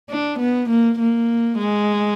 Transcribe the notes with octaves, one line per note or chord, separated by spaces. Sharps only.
D4
B3
A#3
A#3
G#3